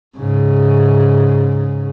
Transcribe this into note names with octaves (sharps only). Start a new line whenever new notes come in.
G#2 C#3